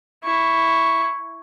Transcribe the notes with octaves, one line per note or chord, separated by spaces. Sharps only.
E4 C#6